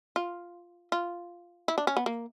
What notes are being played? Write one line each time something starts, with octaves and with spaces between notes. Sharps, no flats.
F4
F4
E4
D4
C#4
B3
A#3